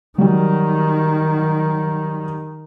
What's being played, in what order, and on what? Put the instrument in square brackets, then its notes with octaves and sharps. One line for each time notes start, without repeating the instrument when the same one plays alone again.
[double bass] D#3 [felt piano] F#3 G3